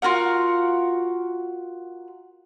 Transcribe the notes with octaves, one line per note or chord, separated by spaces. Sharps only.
F4 F#4 A#4 F#5